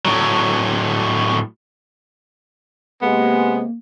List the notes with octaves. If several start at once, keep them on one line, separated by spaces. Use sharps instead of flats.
A2 F#3
C3 G#3 A#3 B3 G4